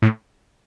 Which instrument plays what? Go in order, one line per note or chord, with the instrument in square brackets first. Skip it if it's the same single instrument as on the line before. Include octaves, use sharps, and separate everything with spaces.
[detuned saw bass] A2